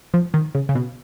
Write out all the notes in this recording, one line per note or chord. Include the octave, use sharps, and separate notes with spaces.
F3
D#3
C#3
C#3
B2